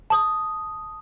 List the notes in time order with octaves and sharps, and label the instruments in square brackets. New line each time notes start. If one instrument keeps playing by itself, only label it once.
[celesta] A5 D#6